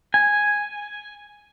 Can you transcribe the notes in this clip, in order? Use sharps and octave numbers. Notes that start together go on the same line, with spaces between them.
G#5